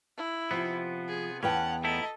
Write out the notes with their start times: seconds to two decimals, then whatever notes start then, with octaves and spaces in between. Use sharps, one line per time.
0.18 E4
0.51 C3 F3 B3
1.08 G#4
1.43 E2 B3 C#4 F#5 G5 A5
1.84 A3 D#4 E4 A4 D#5